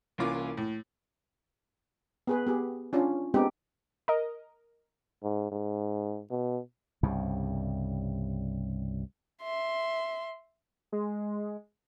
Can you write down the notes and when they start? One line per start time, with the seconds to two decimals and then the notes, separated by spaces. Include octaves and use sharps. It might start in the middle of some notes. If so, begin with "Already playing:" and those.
0.18 C2 E3 A#3 C#4 F4 D6
0.57 A2
2.27 B3 G#4 B4
2.47 B3 G4 G#4
2.93 C#4 D4 F4
3.34 G#3 B3 C4 D4 D#4 G4
4.08 A#4 D#5
5.23 G#2
5.52 G#2
6.30 B2
7.03 C2 G2 C#3
9.43 E5 C6
10.92 G#3